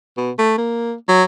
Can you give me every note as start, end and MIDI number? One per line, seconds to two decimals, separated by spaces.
0.17 0.31 47
0.39 0.54 57
0.58 0.93 58
1.09 1.23 54